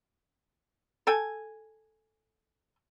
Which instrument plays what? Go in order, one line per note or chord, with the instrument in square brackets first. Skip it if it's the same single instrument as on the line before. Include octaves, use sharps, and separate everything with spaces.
[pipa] A4 G5 G#5